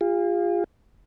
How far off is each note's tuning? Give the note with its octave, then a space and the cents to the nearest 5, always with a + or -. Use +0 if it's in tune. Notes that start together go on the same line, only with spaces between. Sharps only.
F4 +0 G#4 -45